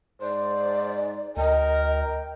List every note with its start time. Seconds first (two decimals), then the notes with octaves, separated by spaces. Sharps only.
0.22 G#2 C5 D5
1.37 D2 A#4 D#5 G5